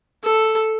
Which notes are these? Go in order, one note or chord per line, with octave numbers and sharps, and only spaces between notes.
A4